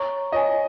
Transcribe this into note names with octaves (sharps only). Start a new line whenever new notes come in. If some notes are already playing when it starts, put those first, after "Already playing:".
Already playing: C#5 A#5 C#6
F4 C#5 D#5 G#5